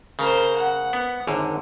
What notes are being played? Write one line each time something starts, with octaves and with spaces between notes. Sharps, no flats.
C#3 A#4 C5
F#5
B3
G#1 F#2 D3